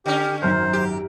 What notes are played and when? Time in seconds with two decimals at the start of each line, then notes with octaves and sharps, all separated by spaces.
0.06 D3 C#4 G4
0.42 G#1 F#2 C5 F6
0.73 G4